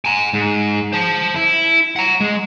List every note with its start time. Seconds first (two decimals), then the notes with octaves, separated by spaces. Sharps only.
0.05 G#5 A#5
0.33 G#2
0.93 C5 A5
1.36 E4
1.96 F#5 A#5
2.20 G#3